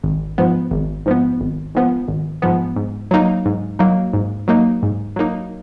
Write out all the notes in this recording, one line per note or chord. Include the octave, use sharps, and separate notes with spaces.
G#1
G#2 F3 B3
G#1
G#2 F3 B3
G#1
G#2 F3 B3
G#1
G#2 F3 B3
G#2
F#3 A#3 D#4
G#2
F#3 A#3 D#4
G#2
F#3 A#3 D#4
G#2
F#3 A#3 D#4